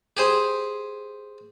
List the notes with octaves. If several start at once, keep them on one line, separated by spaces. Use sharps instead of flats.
G4 G#4 C5